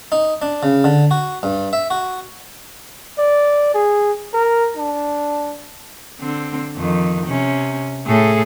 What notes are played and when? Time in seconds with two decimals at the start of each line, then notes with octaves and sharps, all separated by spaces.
0.12 D#4
0.42 D4
0.63 C#3
0.84 D3
1.11 F#4
1.43 G2
1.73 E5
1.90 F#4
3.18 D5
3.74 G#4
4.34 A#4
4.77 D4
6.20 D3 C4
6.77 F2 D#3
7.27 C3 C#4
8.06 A2 G#4 A4